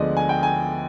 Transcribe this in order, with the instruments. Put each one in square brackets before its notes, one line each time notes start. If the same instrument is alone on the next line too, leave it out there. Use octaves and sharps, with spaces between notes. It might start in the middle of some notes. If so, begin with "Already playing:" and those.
Already playing: [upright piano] D2 D3 F3 G#3 B3 D5 D#5
G#5
G5
G#5